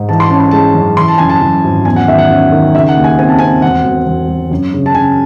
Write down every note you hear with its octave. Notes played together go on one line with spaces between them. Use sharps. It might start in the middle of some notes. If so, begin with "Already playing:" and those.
Already playing: G#2
E3 A5
C6
C#4 A5
C6
G#3 A5
F#2
E3 C6
A5
F#2 G#5
A5
F#2
G#1
E2 G#5
F#5
D#3 E5
F#5
C#4
D#3
C#3 E5
F#5
D#2
G#5
C4 G#5
A5
C4 G#5
E1 F#5
E1
E1
E1
F#2
C#3
A5
C#3 G#5